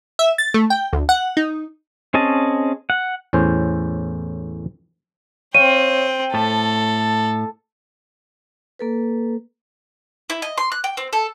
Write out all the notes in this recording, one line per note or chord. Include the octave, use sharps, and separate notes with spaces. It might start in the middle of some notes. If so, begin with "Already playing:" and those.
E5
A6
A3
G5
D2
F#5
D#4
C4 C#4 G#4 D#5 A5
F#5
E2 A2 C#4 C5
C4 C#5 F5 G5 D#7
A2 A4 A5
A#3 A4 B4
E4
D#5
C6
F#6
G5
C4
A4